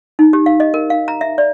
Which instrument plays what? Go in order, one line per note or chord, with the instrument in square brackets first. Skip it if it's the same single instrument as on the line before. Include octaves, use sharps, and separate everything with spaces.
[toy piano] D#4
G4
F5
D#5
A#4
F5
A#5
E5
D5